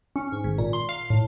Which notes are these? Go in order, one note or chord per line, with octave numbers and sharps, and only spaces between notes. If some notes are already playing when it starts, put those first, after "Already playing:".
C#4
G#2
G#1
A#2
C6
F5
A2